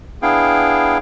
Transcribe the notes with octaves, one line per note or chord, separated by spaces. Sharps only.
B3 D4 E4 G#4 F5 G5